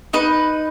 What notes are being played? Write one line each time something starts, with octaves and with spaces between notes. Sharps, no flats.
D#4 B4